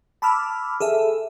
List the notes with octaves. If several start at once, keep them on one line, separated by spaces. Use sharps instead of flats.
A5 B5 D6 E6 F6
G#4 A4 E5